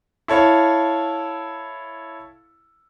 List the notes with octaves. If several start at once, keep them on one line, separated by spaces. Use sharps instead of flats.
E4 A4 C#5 F5